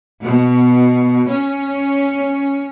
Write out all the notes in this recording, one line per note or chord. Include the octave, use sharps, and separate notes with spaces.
B2
C#4